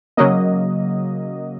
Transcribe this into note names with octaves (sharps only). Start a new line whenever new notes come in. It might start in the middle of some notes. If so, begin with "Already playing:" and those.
C#3 F#3 A#3 D#5